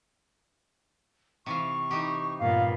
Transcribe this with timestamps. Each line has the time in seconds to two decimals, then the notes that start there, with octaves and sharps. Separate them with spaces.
1.46 C3 E3 F5 C#6
1.91 E3 D#4 G4
2.39 G2 A#2 B3 F5